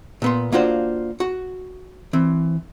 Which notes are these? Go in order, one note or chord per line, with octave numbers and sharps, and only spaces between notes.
A#2 B3 C6
A#3 D4 F4 F#4 C5
F#4
E3 C4